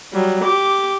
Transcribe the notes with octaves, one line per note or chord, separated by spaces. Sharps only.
F#3 G3
G4 D6